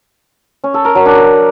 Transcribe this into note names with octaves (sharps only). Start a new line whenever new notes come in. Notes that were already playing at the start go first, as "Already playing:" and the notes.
C#4
A4
A#4
F#3
D4